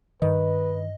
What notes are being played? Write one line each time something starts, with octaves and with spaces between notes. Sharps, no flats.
G2 D#3 B4 D#5